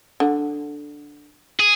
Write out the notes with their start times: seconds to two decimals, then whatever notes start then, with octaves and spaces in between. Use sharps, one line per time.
0.20 D3
1.60 G#4